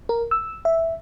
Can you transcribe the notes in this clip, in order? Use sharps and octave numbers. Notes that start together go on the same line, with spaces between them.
A#4
E6
E5